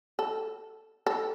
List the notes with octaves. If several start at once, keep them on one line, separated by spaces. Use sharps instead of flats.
A4
A4